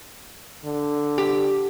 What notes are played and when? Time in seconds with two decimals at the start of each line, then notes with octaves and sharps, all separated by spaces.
0.65 D3
1.18 G4